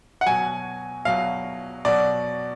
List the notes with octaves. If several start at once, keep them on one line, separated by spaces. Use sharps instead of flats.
F#5
B2 F#3 G#5
B2 F#3 F5
B2 F#3 D5